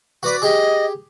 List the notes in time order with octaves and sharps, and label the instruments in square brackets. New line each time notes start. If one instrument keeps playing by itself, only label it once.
[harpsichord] F#4 D5 [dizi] B4
[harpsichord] G4 G#4 [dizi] D#5